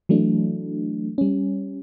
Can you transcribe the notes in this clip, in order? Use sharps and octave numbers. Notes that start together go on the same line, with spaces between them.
E3 F#3 A3 D4
G3 C#4